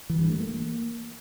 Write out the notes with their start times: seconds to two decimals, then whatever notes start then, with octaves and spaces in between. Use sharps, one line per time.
0.10 E3
0.20 G2
0.30 A3
0.40 A#3